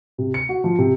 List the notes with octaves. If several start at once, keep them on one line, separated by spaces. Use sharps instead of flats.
C3
C#7
F#4
F3
C3